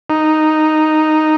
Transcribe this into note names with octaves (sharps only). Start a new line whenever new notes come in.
D#4